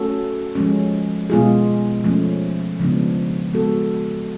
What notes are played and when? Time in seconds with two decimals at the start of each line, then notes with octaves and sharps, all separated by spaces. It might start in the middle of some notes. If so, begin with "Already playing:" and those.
Already playing: A3 C#4 F#4 A4
0.55 F3 G#3 C#4
1.30 B2 G#3 B3 F4 G#4
2.04 F3 A3 C#4
2.79 C#3 F3 G#3 B3 D4
3.53 G#3 B3 F#4 A4